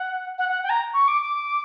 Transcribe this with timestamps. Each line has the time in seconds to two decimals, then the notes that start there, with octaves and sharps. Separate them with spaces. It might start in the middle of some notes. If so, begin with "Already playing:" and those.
Already playing: F#5
0.38 F#5
0.49 F#5
0.63 G5
0.70 A#5
0.94 C#6
1.08 D6
1.22 D6